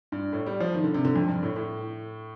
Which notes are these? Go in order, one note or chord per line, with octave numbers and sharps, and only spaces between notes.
G2
A2
G3
F3
D#3
D3
C3
D3
F2
G2
A2
A2